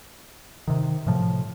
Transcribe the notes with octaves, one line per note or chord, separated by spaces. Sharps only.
C3 D#3
A2 C3 F3